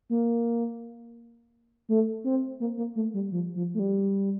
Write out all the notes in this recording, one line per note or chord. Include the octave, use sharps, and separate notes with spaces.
A#3
A3
C4
A#3
A#3
A3
G3
F3
F3
A3
G3